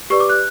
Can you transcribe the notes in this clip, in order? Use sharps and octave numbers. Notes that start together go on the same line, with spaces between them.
G4 B4 D5 C#6
D6
F#6